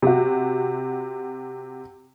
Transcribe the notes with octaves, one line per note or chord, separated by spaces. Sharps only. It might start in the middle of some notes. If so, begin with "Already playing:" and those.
C3 F#4